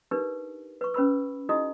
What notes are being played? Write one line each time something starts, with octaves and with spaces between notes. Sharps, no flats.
D4 D#4 G4 A#4 B4
B4 C#6
C#4 B4 B5 E6
D#4 E4 F#4 G#4 D#5 D#6